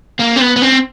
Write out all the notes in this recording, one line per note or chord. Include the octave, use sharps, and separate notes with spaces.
A#3
C4
B3
B3
C4